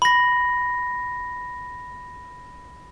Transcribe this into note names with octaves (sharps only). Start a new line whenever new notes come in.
B5 A#6